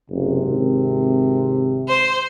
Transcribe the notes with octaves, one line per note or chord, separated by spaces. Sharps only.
F#1 C3
G#1
C5